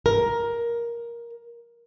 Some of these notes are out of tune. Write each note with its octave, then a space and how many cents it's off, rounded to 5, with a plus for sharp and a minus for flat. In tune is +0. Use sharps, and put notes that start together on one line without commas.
A#4 +10